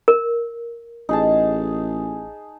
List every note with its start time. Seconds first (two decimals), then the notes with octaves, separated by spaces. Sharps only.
0.08 A#4
1.09 A1 D#4 G#4 A5